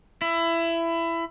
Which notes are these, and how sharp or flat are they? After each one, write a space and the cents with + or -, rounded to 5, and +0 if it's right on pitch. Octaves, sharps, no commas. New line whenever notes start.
E4 +20